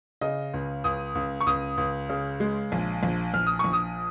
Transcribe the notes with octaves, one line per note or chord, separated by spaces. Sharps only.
C#3 D#5
C#2
C#2 D#6
C#2
C#6
C#2 D#6
C#2
C#3
G#3
A#1
A#1
A#1 F6
D#6
A#1 C#6
D#6